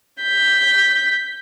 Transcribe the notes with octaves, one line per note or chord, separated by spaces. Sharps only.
G6 B6